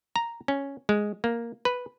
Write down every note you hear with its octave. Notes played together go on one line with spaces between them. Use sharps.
A#5
C#4
G#3
A#3
B4